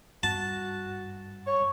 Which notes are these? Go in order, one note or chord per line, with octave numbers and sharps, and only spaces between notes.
G2 F#4 A5
C#5 C#6